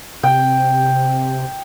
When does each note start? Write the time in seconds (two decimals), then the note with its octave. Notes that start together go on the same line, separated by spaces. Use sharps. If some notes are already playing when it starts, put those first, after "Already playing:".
0.23 C3 G5